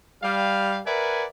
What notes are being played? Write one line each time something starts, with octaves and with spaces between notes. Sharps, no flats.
G3 F5
A#4 B4 D5 E5 F#5 G#5